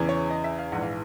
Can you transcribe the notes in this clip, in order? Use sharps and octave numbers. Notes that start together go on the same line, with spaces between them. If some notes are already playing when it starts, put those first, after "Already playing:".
Already playing: E2 C#3 E3
C#5
D#5
E5
F5
A#1 G#2 E3 F#5
F5